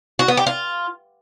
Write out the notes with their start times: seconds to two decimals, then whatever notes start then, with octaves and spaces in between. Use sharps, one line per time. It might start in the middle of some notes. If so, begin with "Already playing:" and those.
0.19 F#4
0.28 B3
0.37 G4
0.47 F4